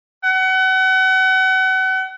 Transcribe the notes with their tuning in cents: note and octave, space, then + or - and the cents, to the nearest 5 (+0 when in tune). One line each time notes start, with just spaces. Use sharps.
F#5 +35